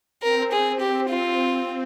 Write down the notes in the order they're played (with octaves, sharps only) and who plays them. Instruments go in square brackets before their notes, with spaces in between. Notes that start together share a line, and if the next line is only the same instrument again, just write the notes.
[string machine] C4 [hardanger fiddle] A#4
[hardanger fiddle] G#4
G4
F4